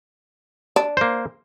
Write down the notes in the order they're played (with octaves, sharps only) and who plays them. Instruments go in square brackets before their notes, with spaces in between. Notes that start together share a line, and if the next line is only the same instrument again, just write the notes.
[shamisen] D4
[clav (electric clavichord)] A#3 C5